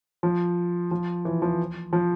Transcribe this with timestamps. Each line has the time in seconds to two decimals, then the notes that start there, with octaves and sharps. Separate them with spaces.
0.23 F3
0.91 F3
1.25 E3
1.42 F3
1.93 F3